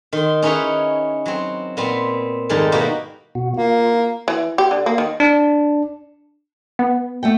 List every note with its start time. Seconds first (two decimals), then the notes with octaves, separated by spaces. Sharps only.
0.13 D#3 C6
0.42 C#4 D#4 E4 G#4 B4 C#5
1.26 F#3 C4
1.77 A#2 B3 C4
2.49 F2 G#2 D#3 G3 D5
2.72 B2 A#3 E4 F#4 G4
3.35 B2 F#4
3.57 A#3 F4
4.28 E3
4.58 G4
4.71 D3
4.86 A#3
4.98 D#3
5.20 D4
6.79 B3
7.23 A3 F#5 G5